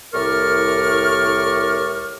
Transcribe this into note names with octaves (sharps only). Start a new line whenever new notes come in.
C2 A2 A#4 D5 C#6 F6